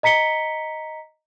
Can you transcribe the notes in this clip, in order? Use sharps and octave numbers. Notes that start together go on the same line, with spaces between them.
D#5 A#5 B6 C#7 G7